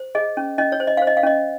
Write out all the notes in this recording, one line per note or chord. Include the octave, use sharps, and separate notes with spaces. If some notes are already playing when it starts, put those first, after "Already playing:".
Already playing: C5
G#4 D#5
C#4
C#4 D#5
C#5
C5
D#5
C5 F5
D#5
F5
C#4 D#5